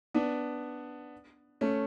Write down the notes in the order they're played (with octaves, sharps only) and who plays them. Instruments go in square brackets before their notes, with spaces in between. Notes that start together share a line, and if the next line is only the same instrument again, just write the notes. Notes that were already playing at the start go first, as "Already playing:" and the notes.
[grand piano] B3 D4
A3 C#4